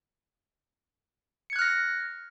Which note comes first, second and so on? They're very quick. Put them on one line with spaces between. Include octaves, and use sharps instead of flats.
C#7 G#6 F#6 F6 A#6